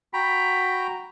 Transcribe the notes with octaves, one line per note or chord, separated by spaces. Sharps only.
F#4 G5 A#5 B5